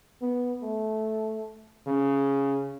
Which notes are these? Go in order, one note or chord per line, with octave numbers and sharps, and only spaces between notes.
B3
A3
C#3